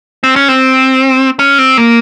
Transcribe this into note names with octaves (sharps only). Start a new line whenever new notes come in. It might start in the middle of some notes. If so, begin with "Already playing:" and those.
C4
C#4
C4
C#4
C4
A#3